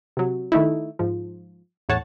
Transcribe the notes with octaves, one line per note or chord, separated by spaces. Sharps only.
C3 F#3
D#3 A3 D#4 E4
G#2 F3
E2 A2 C#5 F#5 A5